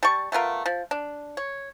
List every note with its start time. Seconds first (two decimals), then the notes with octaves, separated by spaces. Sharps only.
0.03 G3 A5 C#6
0.32 A3 B3 F4 A#4
0.66 F3
0.91 D4
1.37 C#5